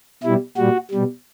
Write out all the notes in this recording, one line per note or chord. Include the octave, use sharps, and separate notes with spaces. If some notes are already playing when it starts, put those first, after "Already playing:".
B2 G3 E4
A#2 G3 F#4
B2 G3